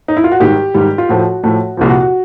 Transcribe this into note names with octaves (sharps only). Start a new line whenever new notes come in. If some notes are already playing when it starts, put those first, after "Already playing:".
D#4
E4
F4
F#4
G#2 D#3 G3 G4
G#2 D#3 G3
F4
A2 F3 A3 F#4
A2 F3 A3
C2 A#2 F3 F4
F#4
F#4